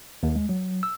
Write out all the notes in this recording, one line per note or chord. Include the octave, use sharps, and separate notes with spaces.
D#2
G#3
F#3
E6